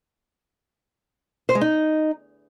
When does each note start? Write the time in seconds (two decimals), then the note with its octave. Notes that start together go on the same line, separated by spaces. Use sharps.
1.49 C5
1.55 G#3
1.61 D#4